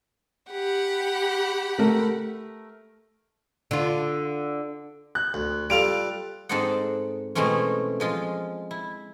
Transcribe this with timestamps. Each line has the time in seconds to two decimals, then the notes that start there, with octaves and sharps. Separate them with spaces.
0.51 G4 F#5 B5
1.79 A3 A#4
3.71 D3 F4
5.15 F#6
5.34 D2
5.70 G3 F4 A4 D7 F7
6.49 G#2 C4 A4 C5 D#5 F#5
7.35 B2 E3 G#3 A3 C4 C#4
8.00 F3 G#3 F4
8.71 E4